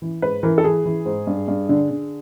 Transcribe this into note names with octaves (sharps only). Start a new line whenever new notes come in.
E3
G#2 B4
E3 A#4
A4
E3 G#4
E3
G#2
G2
G2
D3
D3